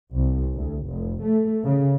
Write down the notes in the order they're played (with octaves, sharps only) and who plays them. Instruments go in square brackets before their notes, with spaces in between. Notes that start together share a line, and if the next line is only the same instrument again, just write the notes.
[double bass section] C2
D2
F1
A3
C#3